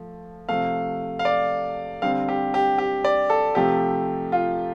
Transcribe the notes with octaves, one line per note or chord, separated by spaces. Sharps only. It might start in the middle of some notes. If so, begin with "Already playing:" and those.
Already playing: F3 A3
C3 F3 A3 F5
F5
D5
D3 G3 C4 F5
G4
G4
G4
D5
A4
C3 F3 A3 G4
F4